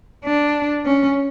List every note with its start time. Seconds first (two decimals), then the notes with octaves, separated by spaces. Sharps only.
0.24 D4
0.85 C#4